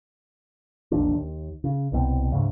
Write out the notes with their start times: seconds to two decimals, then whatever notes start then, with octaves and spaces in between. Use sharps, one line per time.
0.91 E1 A#1 D#2 D4
1.14 D#2
1.64 C#3
1.92 C2 B2 G#3 C4
2.32 D2 G#2 C#3